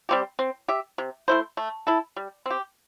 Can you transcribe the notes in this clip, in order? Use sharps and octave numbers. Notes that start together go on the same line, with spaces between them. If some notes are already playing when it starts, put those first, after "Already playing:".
G3 C4 G4
C4
G4 E5
C3
A3 E4 C5
A3
E4 A4
G3
C4 G4